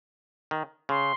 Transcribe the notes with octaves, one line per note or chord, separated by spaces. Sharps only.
D#3
C#3 C6